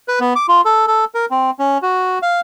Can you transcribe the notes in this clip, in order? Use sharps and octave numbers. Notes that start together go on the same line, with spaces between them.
B4
B3
D6
F4
A4
A4
A#4
C4
C#4
F#4
F5